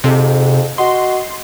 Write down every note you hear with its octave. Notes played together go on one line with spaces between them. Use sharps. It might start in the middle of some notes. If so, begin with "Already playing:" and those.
F2 G#2 C3
F#4 D#5 C6